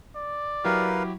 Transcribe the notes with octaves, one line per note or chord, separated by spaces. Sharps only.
D5
F#3 E4 G4 A#4 B4 F5